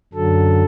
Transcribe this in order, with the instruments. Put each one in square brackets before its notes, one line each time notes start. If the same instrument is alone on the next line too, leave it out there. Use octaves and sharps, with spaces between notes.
[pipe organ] F#2 D3 F#3 A4